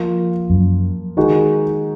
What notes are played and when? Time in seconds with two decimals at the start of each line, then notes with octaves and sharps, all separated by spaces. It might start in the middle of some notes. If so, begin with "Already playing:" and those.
Already playing: F3 A#3 F4
0.50 F#2
1.17 D#3 G#3 D#4 F#4